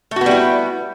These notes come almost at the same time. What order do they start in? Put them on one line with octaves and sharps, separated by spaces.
A3 F#4 B3 G3 E4